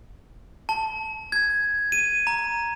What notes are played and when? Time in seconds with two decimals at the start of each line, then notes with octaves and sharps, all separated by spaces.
0.69 A5
1.32 G#6
1.92 D#7
2.27 A#5